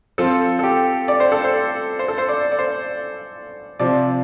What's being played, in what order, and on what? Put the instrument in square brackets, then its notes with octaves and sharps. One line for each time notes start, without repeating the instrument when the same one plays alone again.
[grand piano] F3 C4 F4 [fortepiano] A4
[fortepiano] A4
G4
D5
C5
A4
C5
C5
A4
C5
D5
D5
C5
[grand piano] C3 F3 C4 F4 [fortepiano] D5